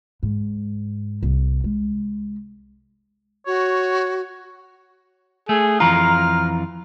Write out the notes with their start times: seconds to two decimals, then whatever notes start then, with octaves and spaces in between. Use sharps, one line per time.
0.23 G#2
1.23 C2
1.64 G#3
3.47 F#4 C#5
5.49 A3 G#4
5.80 F2 E3 F4 A#5 F6